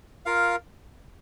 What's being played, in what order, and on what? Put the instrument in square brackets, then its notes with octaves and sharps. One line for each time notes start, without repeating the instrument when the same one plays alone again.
[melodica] F4 A#4 F5